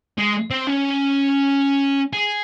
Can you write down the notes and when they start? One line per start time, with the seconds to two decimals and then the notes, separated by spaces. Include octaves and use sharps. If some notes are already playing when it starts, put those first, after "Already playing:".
0.18 G#3
0.51 C4
0.67 C#4
2.13 G#4